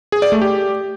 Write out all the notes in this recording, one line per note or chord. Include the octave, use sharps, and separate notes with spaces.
G#4
D5
A3
G4